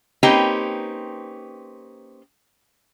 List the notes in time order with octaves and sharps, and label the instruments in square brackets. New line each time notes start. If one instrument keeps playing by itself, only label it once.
[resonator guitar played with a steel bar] A#3 C4 C#4 D#4 G4 B4